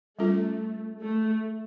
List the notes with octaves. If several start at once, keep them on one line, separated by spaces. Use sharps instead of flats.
G3 A3 C#4 F4 A4
A3